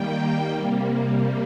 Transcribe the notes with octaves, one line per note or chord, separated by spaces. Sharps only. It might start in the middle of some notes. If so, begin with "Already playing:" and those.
Already playing: D#3 G3 A#3 G5
C3 G3 A#3